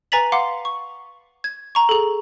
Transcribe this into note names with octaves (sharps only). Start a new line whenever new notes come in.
B4 G#5 A#5 A6 B6 F#7
F5 F#5 C6 D6
C#6
G#6
A#5 C#6
G#4 A4